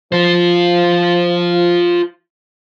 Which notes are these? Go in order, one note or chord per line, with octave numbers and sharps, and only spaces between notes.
F3 F4 C5